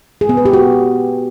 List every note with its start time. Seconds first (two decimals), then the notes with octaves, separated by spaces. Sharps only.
0.21 G#4
0.29 B3
0.37 B4
0.45 G4
0.53 F#4